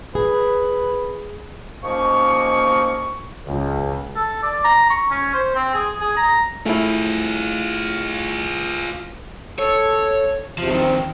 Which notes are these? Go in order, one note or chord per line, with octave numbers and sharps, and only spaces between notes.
G#4 B4
D#2 F3 A#3 C#4 D#5 C#6
C#2
A4
D5
A#5
C#6
C#4
C5
C4
G#4
G#4
A#5
A3 E4 F4 G#4
A4 C#5
E2 C3 F3
D#3 F3 C4